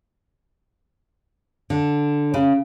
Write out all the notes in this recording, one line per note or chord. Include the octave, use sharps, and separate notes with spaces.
D3
C#3